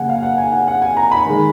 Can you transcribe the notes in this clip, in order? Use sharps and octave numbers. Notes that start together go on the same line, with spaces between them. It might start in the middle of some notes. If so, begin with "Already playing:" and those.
Already playing: C#3 F#3 A#3 F#5 G#5
F5
F#5
G#5
F#5
F#5
G#5
A#5
B5
D#3 G#3